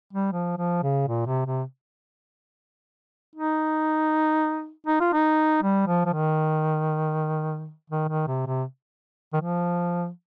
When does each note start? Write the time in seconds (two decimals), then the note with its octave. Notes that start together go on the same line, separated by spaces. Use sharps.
0.13 G3
0.32 F3
0.57 F3
0.83 C#3
1.07 A#2
1.26 C3
1.46 C3
3.35 D#4
4.86 D#4
5.00 F4
5.13 D#4
5.62 G3
5.87 F3
6.05 F3
6.13 D#3
7.90 D#3
8.08 D#3
8.27 C3
8.46 C3
9.33 D#3
9.41 F3